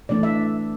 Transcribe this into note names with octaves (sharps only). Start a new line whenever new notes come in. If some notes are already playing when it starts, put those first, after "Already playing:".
E3 A3 D4 D5
E5